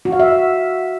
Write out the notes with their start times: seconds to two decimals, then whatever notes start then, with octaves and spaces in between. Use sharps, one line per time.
0.05 F#4
0.12 F5
0.20 E5